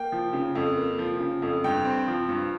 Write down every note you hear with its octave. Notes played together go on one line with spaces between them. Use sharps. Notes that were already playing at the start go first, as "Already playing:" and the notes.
Already playing: A#3 G5
F3
C#3
F2
A#3
F3
C#3
F2
G2 G5
C4
F3
G2